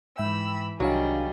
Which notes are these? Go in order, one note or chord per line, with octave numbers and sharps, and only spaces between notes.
G#2 E3 E5 G5 B5 E6
C2 D#3 F#3 G3 D4 G#4 F5